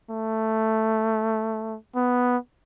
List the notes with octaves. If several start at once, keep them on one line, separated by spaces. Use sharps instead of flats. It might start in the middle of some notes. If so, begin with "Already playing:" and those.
A3
B3